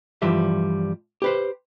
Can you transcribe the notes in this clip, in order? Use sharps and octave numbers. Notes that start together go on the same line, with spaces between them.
G2 E3 F3 G3 E5
G4 B4 C5